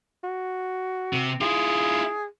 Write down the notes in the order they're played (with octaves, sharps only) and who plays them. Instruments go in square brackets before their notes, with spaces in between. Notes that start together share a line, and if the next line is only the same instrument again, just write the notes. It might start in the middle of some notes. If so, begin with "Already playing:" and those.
[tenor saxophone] F#4
[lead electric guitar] C3
[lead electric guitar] E4 F4 [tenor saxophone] G#4